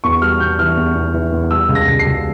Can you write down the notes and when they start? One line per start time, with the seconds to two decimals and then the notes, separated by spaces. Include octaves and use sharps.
0.04 E2 C#6
0.21 G3 F6
0.40 E2 G6
0.59 E3 F6
0.77 E2
0.95 E2
1.14 E3
1.32 E2
1.50 G3 E6
1.69 C#2
1.75 A#6
1.88 C#2
1.99 C7
2.06 C#2